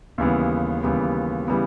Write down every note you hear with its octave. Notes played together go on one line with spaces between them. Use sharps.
D#2 C#3 E3 G3 B3
D#2 C#3 E3 G3 B3
C#3 E3 G3 B3